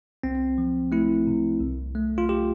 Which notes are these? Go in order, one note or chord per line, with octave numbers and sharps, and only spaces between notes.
C2 C4
F3
A3 E4
C3
C2
A3
F4
G4